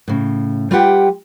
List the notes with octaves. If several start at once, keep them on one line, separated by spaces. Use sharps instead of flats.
A2 C#3
G3 F4 G4 B4 F#5 G5